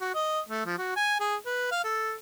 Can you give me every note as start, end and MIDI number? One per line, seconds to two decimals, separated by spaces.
0.01 0.13 66
0.15 0.40 75
0.49 0.65 57
0.66 0.76 53
0.78 0.92 66
0.96 1.20 80
1.20 1.36 68
1.46 1.71 71
1.71 1.83 77
1.84 2.15 69